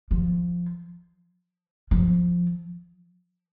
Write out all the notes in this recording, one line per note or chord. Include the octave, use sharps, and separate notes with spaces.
F3
F3